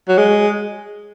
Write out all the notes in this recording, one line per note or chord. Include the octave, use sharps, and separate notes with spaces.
F#3
G#3